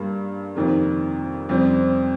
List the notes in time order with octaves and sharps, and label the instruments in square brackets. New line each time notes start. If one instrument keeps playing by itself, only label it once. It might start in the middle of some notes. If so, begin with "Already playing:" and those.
Already playing: [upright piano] G2 G3 A#3
F2 C3 D#3 A#3
F2 C3 G3 C4